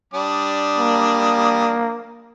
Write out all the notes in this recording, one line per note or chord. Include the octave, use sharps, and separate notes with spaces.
G3 D4 D#6
A#3